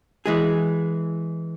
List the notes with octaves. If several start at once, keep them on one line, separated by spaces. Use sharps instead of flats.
E3 G#3 G#4